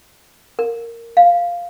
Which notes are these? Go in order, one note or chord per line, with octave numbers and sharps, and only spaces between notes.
A#4
F5